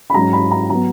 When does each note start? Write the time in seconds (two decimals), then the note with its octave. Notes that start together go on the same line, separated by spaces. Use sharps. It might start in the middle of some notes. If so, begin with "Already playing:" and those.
0.10 B5
0.14 G#2 F#3 C#4 A#5
0.33 B5
0.51 A#5
0.70 F#3 B3 A#5